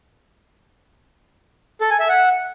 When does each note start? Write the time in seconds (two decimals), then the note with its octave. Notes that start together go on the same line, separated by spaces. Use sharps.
1.81 A4
1.90 G#5
2.00 E5
2.09 F#5